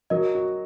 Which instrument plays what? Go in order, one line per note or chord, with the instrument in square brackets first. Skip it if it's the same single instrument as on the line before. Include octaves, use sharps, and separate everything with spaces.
[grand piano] F#3 [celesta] A#4 D#5
[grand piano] F#4